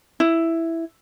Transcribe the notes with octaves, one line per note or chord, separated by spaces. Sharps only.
E4